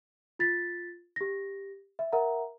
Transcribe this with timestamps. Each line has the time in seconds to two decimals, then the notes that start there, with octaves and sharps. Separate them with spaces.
0.39 F4 A6 B6
1.16 G4 A#6
1.99 E5
2.12 A#4 E5 F#5 A#5